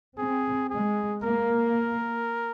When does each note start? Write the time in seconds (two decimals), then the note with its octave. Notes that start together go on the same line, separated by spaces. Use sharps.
0.17 C4 G#4
0.70 G#3 G#4
1.23 A#3 A#4